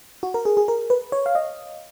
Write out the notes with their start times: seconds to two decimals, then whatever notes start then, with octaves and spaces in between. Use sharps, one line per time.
0.23 F#4
0.34 A#4
0.45 G#4
0.57 G#4
0.68 A#4
0.90 B4
1.12 C#5
1.26 F5
1.35 D#5